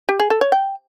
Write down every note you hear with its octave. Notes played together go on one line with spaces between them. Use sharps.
G4
G#4
A4
C#5
G5